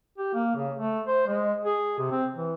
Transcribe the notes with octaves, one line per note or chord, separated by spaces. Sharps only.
G4
A#3
C#3
A3
C5
G#3
G#4
C3
C4
E3